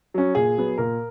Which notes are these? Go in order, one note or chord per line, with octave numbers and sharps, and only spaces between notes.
F#3 C#4
A#2 G#4
F#3 B3
A#2 A#4